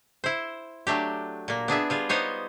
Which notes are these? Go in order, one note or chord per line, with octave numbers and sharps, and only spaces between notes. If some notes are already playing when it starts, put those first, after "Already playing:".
E4 C5
F#3 A3 D4 G4
A#2 A#3
B3 D4 G#4 E5
G3 F4 G#4
B3 D#4 C5 C#5